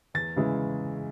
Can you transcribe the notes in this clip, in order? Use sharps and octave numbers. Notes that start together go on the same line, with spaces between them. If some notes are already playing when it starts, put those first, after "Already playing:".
E2 A6
C#3 E3 G#3